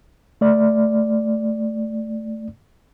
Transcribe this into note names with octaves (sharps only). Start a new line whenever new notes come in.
A3 D5